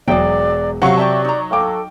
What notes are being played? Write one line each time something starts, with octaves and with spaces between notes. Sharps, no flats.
E1 F#3 G#4 D5 G5
C3 F#3 F5 F#5 C#6
G4 D5 E5 A5
D#4 A#5
A4 F5 G5 D6